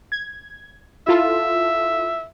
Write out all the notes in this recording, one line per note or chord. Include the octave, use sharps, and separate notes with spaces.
G#6
E4 F4 A4 E5